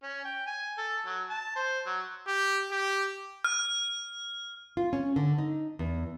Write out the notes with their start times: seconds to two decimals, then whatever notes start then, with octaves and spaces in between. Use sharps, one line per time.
0.03 C#4
0.25 G5
0.47 G#5
0.78 A4
1.06 F#3
1.30 A5
1.56 C5
1.86 F#3
2.27 G4
2.71 G4
3.44 F6
4.77 F4
4.93 C#4
5.16 D3
5.38 D#4
5.79 E2